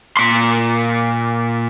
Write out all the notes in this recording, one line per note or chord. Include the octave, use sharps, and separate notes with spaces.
A#2 C6